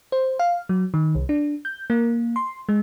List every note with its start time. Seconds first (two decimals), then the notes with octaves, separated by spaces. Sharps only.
0.12 C5
0.39 F5
0.69 F#3
0.94 D#3
1.15 C2
1.29 D4
1.65 G6
1.90 A#3
2.36 C6
2.69 G#3